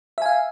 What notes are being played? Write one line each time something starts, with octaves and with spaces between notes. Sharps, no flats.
E5 F5 G#5